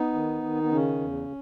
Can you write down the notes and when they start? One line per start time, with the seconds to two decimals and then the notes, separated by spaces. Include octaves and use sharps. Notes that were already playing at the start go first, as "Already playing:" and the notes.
Already playing: B3 D#4
0.14 D#3
0.42 D#3
0.63 B3
0.71 C#3 C#4
1.00 E2